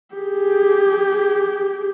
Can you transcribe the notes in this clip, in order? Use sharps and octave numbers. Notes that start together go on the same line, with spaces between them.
G4 G#4